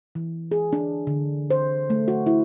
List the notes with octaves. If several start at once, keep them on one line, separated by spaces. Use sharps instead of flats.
E3
G#4
D4
D3
C5
A3
F#4
E4